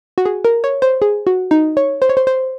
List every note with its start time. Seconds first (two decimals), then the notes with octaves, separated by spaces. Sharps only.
0.18 F#4
0.26 G#4
0.45 A#4
0.64 C#5
0.82 C5
1.02 G#4
1.27 F#4
1.51 D#4
1.77 C#5
2.02 C5
2.09 C#5
2.17 C5
2.27 C5